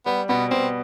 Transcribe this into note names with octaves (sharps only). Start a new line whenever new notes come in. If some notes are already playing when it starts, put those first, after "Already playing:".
G3 B3
B2 B3
B2 C4